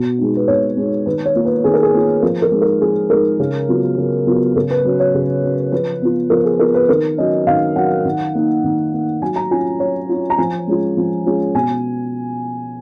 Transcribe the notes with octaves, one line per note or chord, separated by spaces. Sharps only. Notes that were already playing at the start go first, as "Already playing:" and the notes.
Already playing: B2
G#3 B3 D#4
B4
B2 C#5
G#3 B3 D#4
D#3 B4
C#5
A#3 F4
B4
D#3 G#4
A#4
G#4
A#3 F4
F3 A#4
A#4
G#3 D#4
A#4
F3 G#4
G#3 D#4 A#4
C#3
F#3 B3 F4
C#3
F#3 B3 F4
C#3 A#4
B4
F#3 C#4
C#5
C#3
F#3 C#4
F3 B4
B3 F4
F3 A#4
G#4
B3 F4 A#4
B4
D#3 A#4
F#3 C#4 D#5
D#3 F5
F#3 C#4 F#5
D#3
A#3 D#4
D#3
A#3 D#4
F#3 G#5
A#5
C#4 F4 G#5
F#3 C#5
C#4 F4
A#5
F3 G#5
G#3 C#4 F4
F3
G#3 C#4 F4
B2 G#5